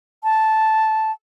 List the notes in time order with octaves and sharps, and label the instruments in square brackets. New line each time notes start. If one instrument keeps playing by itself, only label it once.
[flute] A5